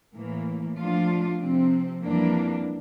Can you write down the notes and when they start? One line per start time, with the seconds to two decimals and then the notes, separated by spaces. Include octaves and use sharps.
0.14 A2 E3 A#3
0.77 F3 A3 D4 F4
1.39 C3 F3 C4
2.02 F2 E3 G3 A#3 D4